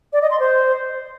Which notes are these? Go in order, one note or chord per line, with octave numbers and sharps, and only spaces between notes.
D5
D#5
C6
C5